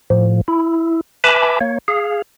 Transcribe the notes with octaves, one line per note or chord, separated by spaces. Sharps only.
A2 F3
E4
B4 E5 G#5 A5 B5 D6
A#3 C#5
G#4 F5